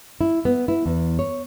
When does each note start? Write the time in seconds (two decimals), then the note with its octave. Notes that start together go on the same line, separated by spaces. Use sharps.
0.21 E4
0.45 B3
0.68 E4
0.86 E2
1.19 C#5